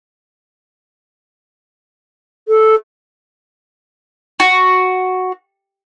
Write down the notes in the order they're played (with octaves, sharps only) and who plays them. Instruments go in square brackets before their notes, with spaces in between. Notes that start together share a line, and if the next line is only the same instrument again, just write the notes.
[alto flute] A4
[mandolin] F#4